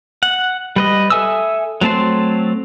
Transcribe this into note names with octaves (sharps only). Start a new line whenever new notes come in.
F#5
G3 B4 D#5
A4 E5 G#5 D#6 E6
F#3 A3 C4 A5 C6